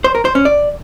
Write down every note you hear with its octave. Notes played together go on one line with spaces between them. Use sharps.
C5
A#4
C5
C#4
D5